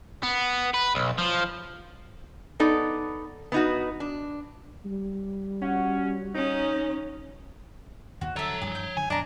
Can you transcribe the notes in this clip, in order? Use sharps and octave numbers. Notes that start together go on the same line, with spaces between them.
B3
B4
B1
F3
B3 D#4 A4 D5
B3 D#4 F#4
D4
G3
C#4 F#4
C#4 D#4
D#2 D#3 F#4
D3 F3 F#3 A4 C#5 E5 A#5
G2 E3 G#4
G6
D3 F#3 G#5
F#2 B2 F#3 D4 D#5 A#5